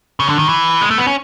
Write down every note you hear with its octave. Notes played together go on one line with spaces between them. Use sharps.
C#3
D3
D#3
E3
G#3
A3
B3
C#4